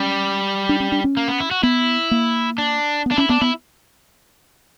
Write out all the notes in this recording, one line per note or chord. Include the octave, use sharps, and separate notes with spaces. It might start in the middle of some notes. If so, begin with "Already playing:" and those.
Already playing: G3 C#4
D4
C#4
D4
C#4
A#3
B3
E4
F#4
B3 E4
A#3
D4
B3
D4
C#4 E4
B3 D4
B3 E4